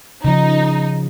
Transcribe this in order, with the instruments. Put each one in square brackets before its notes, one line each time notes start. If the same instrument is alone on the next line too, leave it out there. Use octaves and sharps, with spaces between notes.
[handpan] C#3 F3 [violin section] D#4